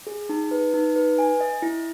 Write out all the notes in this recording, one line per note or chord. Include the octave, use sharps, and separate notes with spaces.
G#4
D#4
B4
D#4
B4
G#5
D#5
E4